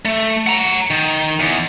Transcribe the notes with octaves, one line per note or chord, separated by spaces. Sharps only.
A3
F#5 A#5
D#3
E2